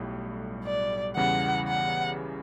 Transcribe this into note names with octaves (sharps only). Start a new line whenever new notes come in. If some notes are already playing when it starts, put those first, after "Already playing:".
Already playing: B1 A2 G3
D5
E2 C#3 E3 G3 F#5
F#5